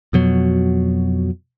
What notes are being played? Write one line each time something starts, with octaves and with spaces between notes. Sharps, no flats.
F2 B2 F#3